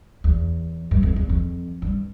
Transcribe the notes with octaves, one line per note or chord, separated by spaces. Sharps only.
E2
G2
F2
E2
F2
G2